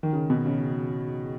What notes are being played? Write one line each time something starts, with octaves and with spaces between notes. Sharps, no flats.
D#3
C#3
B2
C#3